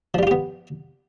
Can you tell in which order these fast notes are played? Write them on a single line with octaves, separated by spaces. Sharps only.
F3 G3 F4 G4 B3